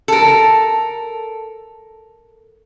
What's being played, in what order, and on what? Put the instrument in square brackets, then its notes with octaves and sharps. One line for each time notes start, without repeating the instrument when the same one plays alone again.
[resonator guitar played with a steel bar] A4 A#4